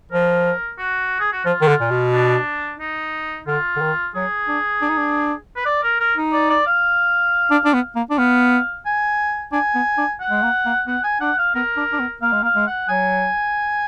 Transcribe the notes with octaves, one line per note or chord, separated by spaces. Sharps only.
F3 A#4
F#4
G#4
F#4
F3 F4
D#3
D3
A#2
B2
D4
D#4
D3 F4
D3
D#3
F#3 G#4
D4
D4
D#4
D4
B4
D5
A#4
A#4
D#4
D5
D5
F5
D4
D4
B3
A#3
D4
B3 F5
G#5
D4 G#5
B3
D4
F#5
G#3
A#3
A#3
B3 F#5
G#5
D4 F#5
F5
B3 A#4
D4
D4
B3
A#3 F5
G#3
A#3 F5
G#3
F#5
F#3 G#5